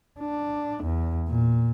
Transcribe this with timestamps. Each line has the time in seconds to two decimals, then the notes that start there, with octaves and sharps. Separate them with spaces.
0.19 D4
0.84 E2
1.28 A#2